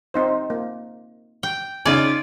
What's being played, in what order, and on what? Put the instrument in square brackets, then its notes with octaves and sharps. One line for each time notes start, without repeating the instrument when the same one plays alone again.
[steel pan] C4 D#4 C5
A#3
[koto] G5
[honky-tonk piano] C#3 D#4 [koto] F4 D5 [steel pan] G#5